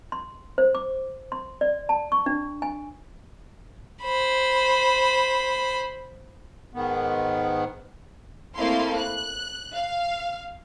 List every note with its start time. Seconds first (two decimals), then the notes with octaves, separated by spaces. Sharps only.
0.12 C6
0.58 C5
0.75 D6
1.32 C6
1.61 D5
1.89 A5
2.12 C#6
2.26 D4
2.62 G#5
4.03 C5 B5
6.74 G#2 D#3 B3
8.57 A3 A#3 C4 E4 F5 C6
8.97 F#6
9.75 F5